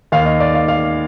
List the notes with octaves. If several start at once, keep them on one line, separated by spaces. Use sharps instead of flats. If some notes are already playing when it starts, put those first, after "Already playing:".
D#2 D#3 F5
D#5
D5
F5
F5